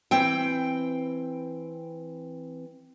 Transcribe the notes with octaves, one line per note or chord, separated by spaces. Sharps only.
E3 C4 G5